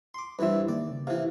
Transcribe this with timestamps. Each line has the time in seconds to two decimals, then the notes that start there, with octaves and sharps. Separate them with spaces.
0.14 C6 D6
0.39 G2 E3 C4 B4 E5
0.68 D#3 A#3 D5
0.91 C#3
1.07 C3 E3 F5